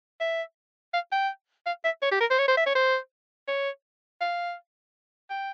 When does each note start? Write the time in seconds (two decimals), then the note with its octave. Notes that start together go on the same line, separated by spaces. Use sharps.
0.20 E5
0.94 F5
1.12 G5
1.66 F5
1.85 E5
2.02 C#5
2.11 G4
2.20 A#4
2.30 C5
2.39 C#5
2.48 C5
2.57 E5
2.66 C#5
2.75 C5
3.48 C#5
4.21 F5
5.30 G5